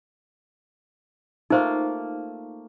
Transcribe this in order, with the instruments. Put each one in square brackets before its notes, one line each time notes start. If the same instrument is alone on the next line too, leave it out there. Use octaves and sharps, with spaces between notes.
[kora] A3 A#3 F4 [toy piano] D#4 C5